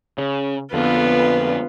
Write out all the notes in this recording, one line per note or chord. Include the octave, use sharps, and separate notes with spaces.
C#3
F2 D3 B3 F4 B4